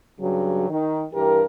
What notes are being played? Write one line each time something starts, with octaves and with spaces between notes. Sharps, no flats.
G2 C#3 F#3
D#3
G2 E3 G4 A#4